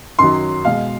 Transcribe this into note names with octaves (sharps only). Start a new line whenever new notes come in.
F#2 D#3 F#3 C6
B2 G#3 F5